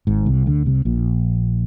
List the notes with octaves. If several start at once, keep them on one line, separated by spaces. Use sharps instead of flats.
G#1 G#2
C2 C3
D2 D3
C2 C3
A#1 A#2